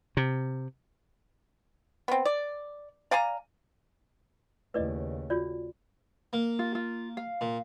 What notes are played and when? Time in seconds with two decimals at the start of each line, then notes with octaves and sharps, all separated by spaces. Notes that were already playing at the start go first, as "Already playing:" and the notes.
0.17 C3
2.08 B3 C4
2.25 D5
3.11 D5 F5 G#5 A#5
4.74 D#2 C#3 A3 E4 B4 D5 D#5
5.30 F4 F#4 D5 G6
6.33 A#3
6.59 F4
6.75 F4
7.17 F5
7.41 A#2